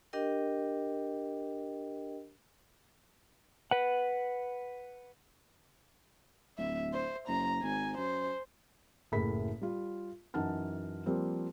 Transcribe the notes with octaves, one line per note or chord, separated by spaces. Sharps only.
D4 G4 A#4 D#5 G5
B4 F#5
D1 E5
C5
F#1 A#5
G#1 G#5
F#2 C5
F#1 A2 G#4 B5 B6
G3 F4
F#2 E3 D#4 F#5 A5 F6
F3 G3 A#3 C4